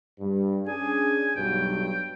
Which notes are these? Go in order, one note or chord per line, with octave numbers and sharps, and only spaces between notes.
G2
C#4 D4 G#4 G#5
B1 G2 F#3 G5